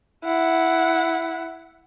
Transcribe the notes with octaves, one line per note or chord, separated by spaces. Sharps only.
E4 F#5